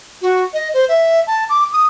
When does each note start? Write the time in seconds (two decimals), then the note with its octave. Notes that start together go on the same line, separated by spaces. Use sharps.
0.22 F#4
0.54 D#5
0.74 C5
0.89 E5
1.27 A5
1.49 D6
1.73 D#6